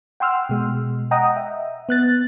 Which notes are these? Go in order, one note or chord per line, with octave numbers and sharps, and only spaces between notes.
F#5 G5 C6 E6 F6
B2 G#3
D#5 F#5 G5 A#5 D#6
E5
B3 F#6 A6